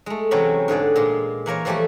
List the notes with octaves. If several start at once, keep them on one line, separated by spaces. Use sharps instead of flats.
G#3 A3
C3 E3 F#3 C#4 G5 B5
G#2 D3 G#4 D5
A#2 G#3 C6
E3 A#3 A#4 C#5
E3 F3 G3 A3 E4 G4